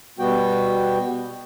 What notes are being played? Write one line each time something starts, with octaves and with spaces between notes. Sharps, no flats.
B2 G3 B3 F#4 G5